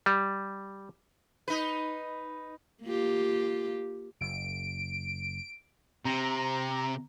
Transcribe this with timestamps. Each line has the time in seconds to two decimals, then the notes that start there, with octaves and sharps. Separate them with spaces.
0.06 G3
1.48 D#4 B4
2.84 A#3 F4 G4
4.21 F#1 D7
6.05 C3 C4 A#5